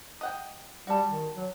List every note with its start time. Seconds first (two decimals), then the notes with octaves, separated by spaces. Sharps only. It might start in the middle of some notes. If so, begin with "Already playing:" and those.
0.21 D#5 F#5 G5
0.87 G3 F#4 A4
1.10 D#3
1.36 F#3